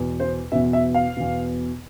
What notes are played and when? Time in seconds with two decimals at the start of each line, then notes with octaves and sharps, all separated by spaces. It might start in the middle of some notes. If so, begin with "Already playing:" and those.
Already playing: E2 B2
0.20 C5
0.52 E2 B2 E5
0.73 E5
0.94 F5
1.16 E2 B2